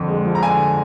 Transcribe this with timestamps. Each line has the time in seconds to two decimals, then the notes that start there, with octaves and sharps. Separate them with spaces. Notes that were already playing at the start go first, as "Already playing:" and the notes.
Already playing: F2 D3
0.08 G#3
0.25 F3
0.35 A#5
0.42 D3 G#5